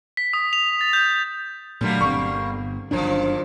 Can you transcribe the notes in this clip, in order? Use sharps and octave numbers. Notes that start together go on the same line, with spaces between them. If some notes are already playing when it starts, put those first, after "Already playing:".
B6
D#6
F7
A6
G6
A#2 D3 F#3 G3 A3 A#3
G1 A#2 C4 C#6
G1 F#2 A#2 D#3 F3 D4